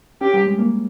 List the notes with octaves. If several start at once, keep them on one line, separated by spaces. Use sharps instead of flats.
C#4 G4
G3
G#3
A#3